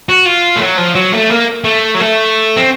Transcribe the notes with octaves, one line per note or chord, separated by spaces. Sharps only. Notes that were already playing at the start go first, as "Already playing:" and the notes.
F#4
F4
A3
F#3
F3
F#3
A3
A#3
A3
F#3
A3
C4